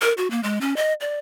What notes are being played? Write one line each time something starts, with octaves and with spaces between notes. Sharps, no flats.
A#4
F#4
A#3
G#3
C#4
D#5
D5